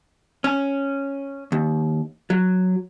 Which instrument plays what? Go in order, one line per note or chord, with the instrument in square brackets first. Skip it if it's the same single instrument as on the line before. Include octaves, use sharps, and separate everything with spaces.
[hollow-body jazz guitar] C#4
D#2
F#3